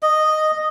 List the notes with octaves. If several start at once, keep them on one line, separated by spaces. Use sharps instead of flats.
D#5